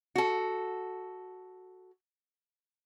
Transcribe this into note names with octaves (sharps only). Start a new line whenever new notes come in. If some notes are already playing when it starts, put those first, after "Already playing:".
F#4 A4